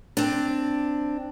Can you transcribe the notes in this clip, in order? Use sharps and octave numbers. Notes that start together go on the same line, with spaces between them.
C4 D4